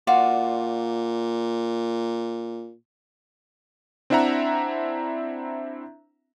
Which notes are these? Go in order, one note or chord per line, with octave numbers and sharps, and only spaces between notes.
A#2 F4 F#4 D5
C4 D4 E4 E5 F#5 A#5